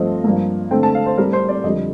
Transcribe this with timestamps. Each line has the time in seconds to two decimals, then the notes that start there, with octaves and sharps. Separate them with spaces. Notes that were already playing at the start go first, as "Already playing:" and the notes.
Already playing: G2 F3 A3 C4 D#5
0.24 G2 F3 A#3
0.71 D3 A3 C4 G5
0.83 A5
0.95 F5
1.06 C5
1.17 A2 G3 C4 A#4
1.33 C5
1.49 D5
1.64 F2 D3 G3 D#5